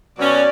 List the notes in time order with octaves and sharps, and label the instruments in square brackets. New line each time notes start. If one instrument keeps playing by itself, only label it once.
[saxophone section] B2 F#3 C#4 [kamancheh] D5